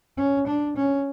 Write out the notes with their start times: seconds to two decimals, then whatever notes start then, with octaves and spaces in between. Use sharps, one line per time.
0.17 C#4
0.47 D4
0.76 C#4